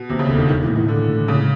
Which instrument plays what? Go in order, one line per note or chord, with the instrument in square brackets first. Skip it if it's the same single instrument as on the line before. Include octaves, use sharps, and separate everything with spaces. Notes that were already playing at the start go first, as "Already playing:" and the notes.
Already playing: [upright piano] B2
[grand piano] D#2 [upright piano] C3
[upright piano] C#3
[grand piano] E1 [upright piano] D3
[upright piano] D#3
[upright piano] D#3 [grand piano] G#3
[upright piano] E3
[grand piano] A2
[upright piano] E3
[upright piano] D3 [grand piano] E3
[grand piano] A2
[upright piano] C#3 [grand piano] G#3